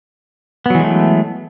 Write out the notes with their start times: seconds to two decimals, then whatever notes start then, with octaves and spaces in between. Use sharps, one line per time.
0.66 B3
0.70 F#3
0.75 E3
0.79 G#3
0.84 A3